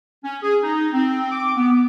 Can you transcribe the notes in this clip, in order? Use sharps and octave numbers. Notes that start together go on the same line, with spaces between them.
C#4
G#4
D#4
C4
D6
B3